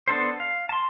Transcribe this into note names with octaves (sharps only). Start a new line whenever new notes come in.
B3 D4 A4 C5
F5
A5 C6